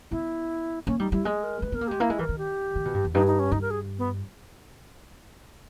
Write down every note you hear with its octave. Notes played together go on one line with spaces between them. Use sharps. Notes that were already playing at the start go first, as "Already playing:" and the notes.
B3 E4
A#3 C#4
G3 D#4
G3 E4
G#3 G#4
A#4
G#3 B4
B3 A#4
A#3
G#3 G4
A#3 E4
G#3
E3 A#4
D#3
G4
D#3
B2
G2
E2
G2 D#4
D#4
C#4
G2 D#4
A#4
G#4
B3